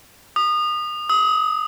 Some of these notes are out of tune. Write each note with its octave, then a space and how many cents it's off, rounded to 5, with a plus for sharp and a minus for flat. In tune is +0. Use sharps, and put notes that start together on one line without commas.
D#6 -30
D#6 +35